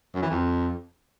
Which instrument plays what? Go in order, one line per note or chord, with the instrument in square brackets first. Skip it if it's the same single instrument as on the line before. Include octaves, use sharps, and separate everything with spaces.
[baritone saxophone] F#2
E3
F2